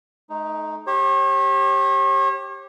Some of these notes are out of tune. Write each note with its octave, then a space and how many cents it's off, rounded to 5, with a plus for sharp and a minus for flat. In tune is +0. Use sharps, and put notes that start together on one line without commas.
A3 -40 D#4 +0
G4 +0 C#5 -40